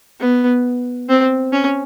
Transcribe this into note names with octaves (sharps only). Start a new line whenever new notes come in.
B3
C4
C#4